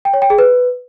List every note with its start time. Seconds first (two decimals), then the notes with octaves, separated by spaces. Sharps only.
0.05 G5
0.14 C#5
0.22 G5
0.30 G#4
0.38 B4